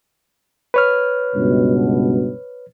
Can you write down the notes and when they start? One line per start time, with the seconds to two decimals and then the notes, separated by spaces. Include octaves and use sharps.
0.74 B4 C#5 F6
1.35 C#2 G2 B2